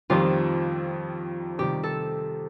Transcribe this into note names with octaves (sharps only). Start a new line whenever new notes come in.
F2 D#3 G3 C4 F4 G4
C3 D#3 G3 G4
A4